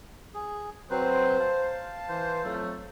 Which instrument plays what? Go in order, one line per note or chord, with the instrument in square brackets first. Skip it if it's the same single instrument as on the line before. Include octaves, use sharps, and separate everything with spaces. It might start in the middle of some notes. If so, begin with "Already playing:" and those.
[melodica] G#4
[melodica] F#3 C4 B4 [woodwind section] C5
[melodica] F5 A5
[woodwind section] E3 C5
F2 F#3 A3